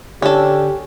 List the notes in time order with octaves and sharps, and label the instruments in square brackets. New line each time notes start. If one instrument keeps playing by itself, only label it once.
[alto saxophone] D3 [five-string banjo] C#4 A4 [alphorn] G4